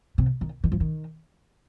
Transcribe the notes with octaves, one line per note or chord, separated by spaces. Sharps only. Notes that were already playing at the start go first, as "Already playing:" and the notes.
C3
D#3
D#3
F3
D#3